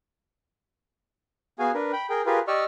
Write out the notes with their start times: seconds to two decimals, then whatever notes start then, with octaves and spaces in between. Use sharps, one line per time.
1.59 B3 F#4 G#4 F5 G#5
1.74 D4 A#4 B4
1.93 G5 B5
2.10 G#4 A#4 G5
2.26 F4 G4 G#4 A#4 B4
2.48 G4 D5 D#5 C#6 E6 F6